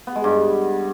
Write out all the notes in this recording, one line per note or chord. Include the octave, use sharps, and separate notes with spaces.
B3
G#3
G2